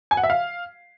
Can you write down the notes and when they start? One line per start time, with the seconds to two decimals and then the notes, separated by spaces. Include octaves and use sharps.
0.11 G#5
0.17 F#5
0.23 E5
0.30 F5